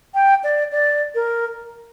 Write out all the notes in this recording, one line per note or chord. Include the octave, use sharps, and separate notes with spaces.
G5
D5
D5
A#4